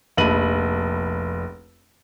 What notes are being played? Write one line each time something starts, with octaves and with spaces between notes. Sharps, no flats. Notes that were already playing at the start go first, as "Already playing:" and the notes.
F1 A#1 B5 D#7 F#7